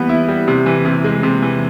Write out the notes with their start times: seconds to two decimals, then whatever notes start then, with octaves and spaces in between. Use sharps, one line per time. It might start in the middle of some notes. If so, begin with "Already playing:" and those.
Already playing: E3 G3 B3
0.09 E4
0.28 G3
0.48 C3
0.66 E3
0.85 C3
1.04 G#3
1.23 C3
1.42 E3